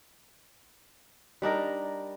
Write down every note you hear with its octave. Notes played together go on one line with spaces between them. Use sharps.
G3 D4 D#4 A#4